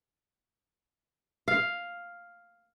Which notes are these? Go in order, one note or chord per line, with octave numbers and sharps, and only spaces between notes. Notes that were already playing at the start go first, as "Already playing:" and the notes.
F5